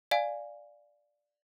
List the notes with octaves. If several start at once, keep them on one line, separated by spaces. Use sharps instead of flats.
D5 F5 G#5